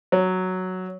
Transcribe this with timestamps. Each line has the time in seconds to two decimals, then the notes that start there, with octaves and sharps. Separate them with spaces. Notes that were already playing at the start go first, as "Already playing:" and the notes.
0.12 F#3